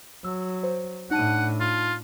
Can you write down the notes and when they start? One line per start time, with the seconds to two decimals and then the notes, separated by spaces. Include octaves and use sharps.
0.24 F#3 E6
0.63 C5
1.11 A2 D4 D#4 F#5 A5 D#7
1.60 F4